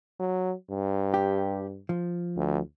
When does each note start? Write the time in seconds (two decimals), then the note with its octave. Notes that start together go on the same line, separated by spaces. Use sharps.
0.20 F#3
0.71 G2
1.14 G4
1.89 F3
2.36 D2